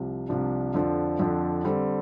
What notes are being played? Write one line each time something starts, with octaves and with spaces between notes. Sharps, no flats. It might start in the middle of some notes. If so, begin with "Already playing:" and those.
Already playing: C2 C3 F3
C2 C3 F3 D4
F2 D3 F3 D4
F2 D3 F3 D4
D3 G3 C4 A4